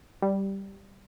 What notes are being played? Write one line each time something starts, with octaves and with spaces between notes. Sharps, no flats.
G3